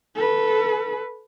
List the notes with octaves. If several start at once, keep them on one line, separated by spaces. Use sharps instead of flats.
A4 B4